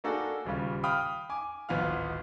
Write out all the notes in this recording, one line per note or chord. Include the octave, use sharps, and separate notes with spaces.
A#3 D4 D#4 F#4 G#4 A4
D#1 C#3 G3 F4
F5 G5 B5 D#6 F6
G#5 D6
D1 G#1 B3 F4 F5 F6